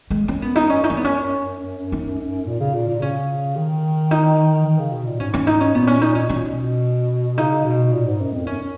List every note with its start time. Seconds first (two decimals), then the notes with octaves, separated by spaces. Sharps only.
0.10 G#3
0.28 F#2 C#4
0.42 B3
0.56 D#4
0.70 C#4
0.84 D#4
0.90 C#4
0.97 B3
1.04 C#4
1.92 D#4
2.46 A#2
2.60 C#3
2.75 A#2
2.88 A#2
3.01 C#3 C#4
3.56 D#3
4.11 D#4
4.66 D#3
4.79 C#3
4.92 B2
5.06 A#2
5.20 G#2 C#4
5.34 C#4
5.47 D#4
5.60 C#4
5.74 A#2 B3
5.87 C#4
6.02 D#4
6.15 C#4
6.28 B2 C#4
6.37 A#2
6.45 B2
7.38 C#3 D#4
7.65 B2
7.92 A#2
8.07 G#2
8.20 F#2
8.33 F2
8.46 F#2 C#4